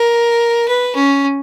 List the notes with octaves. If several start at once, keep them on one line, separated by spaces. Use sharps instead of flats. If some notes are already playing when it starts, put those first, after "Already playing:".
Already playing: A#4
B4
C#4